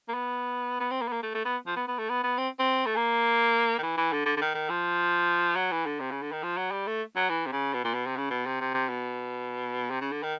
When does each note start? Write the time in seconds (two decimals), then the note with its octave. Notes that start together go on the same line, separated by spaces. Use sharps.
0.09 A#3
0.14 B3
0.80 B3
0.91 C4
1.01 A#3
1.08 B3
1.12 A#3
1.23 A3
1.34 A3
1.45 B3
1.67 F3
1.76 B3
1.88 B3
1.98 A3
2.09 B3
2.23 B3
2.38 C4
2.59 C4
2.86 A3
2.96 A#3
3.78 D#3
3.83 E3
3.97 E3
4.12 D3
4.26 D3
4.37 D3
4.41 D#3
4.55 D#3
4.70 F3
5.56 F#3
5.71 E3
5.86 D3
6.00 C3
6.11 C#3
6.22 D3
6.32 D#3
6.43 F3
6.57 F#3
6.71 G3
6.87 A3
7.16 F#3
7.29 E3
7.46 C3
7.52 C#3
7.74 B2
7.84 A#2
7.94 B2
8.06 C3
8.17 C#3
8.30 B2
8.46 C3
8.61 C3
8.74 C3
8.89 B2
9.90 C3
10.01 C#3
10.12 D3
10.23 D#3